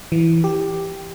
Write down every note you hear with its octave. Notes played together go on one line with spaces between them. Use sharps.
E3
G4